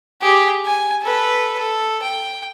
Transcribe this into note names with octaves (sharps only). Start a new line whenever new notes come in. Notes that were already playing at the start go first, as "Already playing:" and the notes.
G4 G#4
G#5
A4 B4
A4
G5